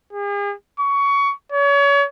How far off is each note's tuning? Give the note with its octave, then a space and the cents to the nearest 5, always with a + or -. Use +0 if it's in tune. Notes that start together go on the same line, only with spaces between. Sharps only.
G#4 -45
C#6 +20
C#5 +35